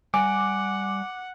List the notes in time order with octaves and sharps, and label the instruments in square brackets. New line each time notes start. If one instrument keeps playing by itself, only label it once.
[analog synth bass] G3 [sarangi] F#5 [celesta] G#5 [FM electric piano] D6